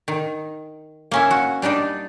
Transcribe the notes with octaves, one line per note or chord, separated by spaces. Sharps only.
D#3
A#3 C#4 E4
F#4
G3 D4 D#4 D5